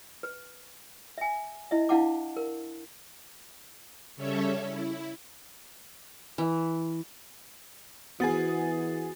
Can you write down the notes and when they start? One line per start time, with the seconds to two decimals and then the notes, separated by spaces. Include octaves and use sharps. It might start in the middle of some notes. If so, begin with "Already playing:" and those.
0.23 B4
1.18 E5 G#5
1.71 E4 D#5 E5
1.89 D4 E4 F5 F#5 A5 D6
2.37 A#4
4.16 C#3 G3 C#4 A4 C#5 E5
4.65 E4
6.38 E3
8.20 E3 B3 F#4 G#4 A6